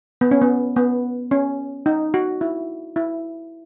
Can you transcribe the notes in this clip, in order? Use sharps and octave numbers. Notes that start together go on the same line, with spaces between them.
B3
C#4
B3
B3
C#4
D#4
F#4
E4
E4